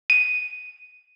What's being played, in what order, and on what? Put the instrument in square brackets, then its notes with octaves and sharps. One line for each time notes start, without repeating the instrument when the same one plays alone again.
[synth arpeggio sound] D#7